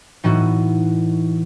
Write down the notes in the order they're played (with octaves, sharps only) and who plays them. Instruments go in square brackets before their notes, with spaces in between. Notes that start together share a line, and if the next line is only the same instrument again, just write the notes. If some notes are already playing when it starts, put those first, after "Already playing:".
[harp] A2 E3 B3 D#4 F#4